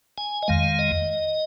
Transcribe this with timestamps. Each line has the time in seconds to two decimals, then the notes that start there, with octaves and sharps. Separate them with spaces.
0.18 G#5
0.43 D#5
0.48 F2 D#3 G#3 F5
0.79 D#5